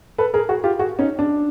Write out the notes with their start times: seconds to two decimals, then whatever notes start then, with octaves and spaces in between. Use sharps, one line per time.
0.18 A4 B4
0.34 G#4 A#4
0.49 F#4 G#4
0.64 F4 G4
0.79 F#4 G#4
0.99 C#4 D#4
1.19 D4